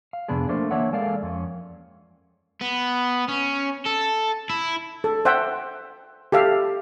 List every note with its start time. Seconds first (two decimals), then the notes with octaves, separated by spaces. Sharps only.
0.13 F5
0.28 F2 C3 B3 D4 G#4
0.49 A3 A#3 D4 A#4 C5
0.71 E3 A#3 D4 C#5 E5 F#5
0.93 G#3 A4 A#4 D5 F5
1.23 F2 C#4
2.61 B3
3.29 C#4
3.86 A4
4.50 E4
5.04 A4
5.25 C5 E5 F#5 G5
6.32 G4 A4 E5 F5